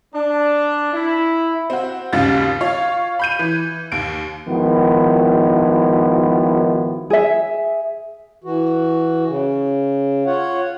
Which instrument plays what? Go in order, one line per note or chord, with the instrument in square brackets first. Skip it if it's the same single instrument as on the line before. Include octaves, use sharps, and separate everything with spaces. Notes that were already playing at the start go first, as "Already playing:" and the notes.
[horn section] D4
E4
[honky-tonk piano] C4 F#4
G#1 D#2 C#3 G3 F4 A6
F4 C#5 F5
B5 G6 D#7
E3
D#2 D7
[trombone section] G#1 D#3 F3 B3 E4 F#4
[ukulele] G#4 E5
[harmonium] E3 F#4
C#3
F4 C#5 F#5